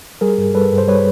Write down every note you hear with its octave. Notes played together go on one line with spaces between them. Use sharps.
G3 G#4 A#4
G2
G3 A4 B4
G2
C5
G3 B4 C#5